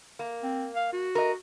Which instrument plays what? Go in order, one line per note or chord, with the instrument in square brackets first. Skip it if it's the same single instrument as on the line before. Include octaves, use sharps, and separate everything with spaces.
[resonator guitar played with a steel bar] A#3
[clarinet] C4
F5
F#4
[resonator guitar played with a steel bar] A#4 D#5